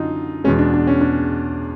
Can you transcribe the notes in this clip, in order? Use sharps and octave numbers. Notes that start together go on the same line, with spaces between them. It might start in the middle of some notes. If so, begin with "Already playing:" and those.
Already playing: F#2 D3 D#4 F4
E2 B2 G#3 C#4
D4
D4
C#4
D4